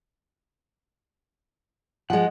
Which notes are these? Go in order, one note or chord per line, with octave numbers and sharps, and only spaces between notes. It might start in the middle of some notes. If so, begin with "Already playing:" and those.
F3 G#3 F#5